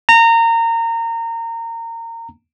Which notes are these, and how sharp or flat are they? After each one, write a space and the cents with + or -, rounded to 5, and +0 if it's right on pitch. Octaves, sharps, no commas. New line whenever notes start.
A#5 -25